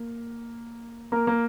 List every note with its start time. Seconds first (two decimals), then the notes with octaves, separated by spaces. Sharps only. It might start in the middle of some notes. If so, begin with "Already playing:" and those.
Already playing: A#3
1.12 A#3 A#4
1.27 A#3 A#4